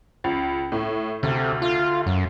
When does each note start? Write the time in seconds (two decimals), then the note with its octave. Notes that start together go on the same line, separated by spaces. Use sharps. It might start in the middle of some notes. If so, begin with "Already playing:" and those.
0.24 C#2
0.72 A2
1.23 D2 C3
1.62 F4
2.06 F#2